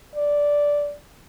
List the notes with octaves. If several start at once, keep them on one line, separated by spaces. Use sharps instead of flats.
D5